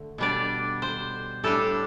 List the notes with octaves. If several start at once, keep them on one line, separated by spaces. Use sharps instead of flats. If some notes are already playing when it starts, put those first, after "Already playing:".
Already playing: D3 A3
B2 G3 D4 D5
C5
A2 G3 D4 A4